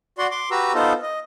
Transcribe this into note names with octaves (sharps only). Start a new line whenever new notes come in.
F#4 D5 F#5 C6
C6 D6
F#4 G4 B4 A#5 E6
B3 D#4 F4 A4 C5
D#5